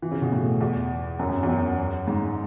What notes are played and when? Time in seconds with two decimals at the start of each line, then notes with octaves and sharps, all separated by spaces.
0.02 E3
0.11 C#3
0.22 B2
0.32 A2
0.61 E2
1.19 F#2
1.29 F#2
1.43 E2
1.49 F#2
2.07 G#2